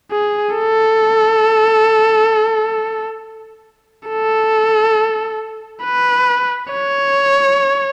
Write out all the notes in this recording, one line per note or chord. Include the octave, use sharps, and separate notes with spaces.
G#4
A4
A4
B4
C#5